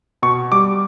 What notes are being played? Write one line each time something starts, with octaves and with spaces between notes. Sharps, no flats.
B2 C#6
G3 D6